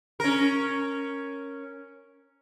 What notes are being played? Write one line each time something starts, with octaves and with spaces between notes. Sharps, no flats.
C#4 A#4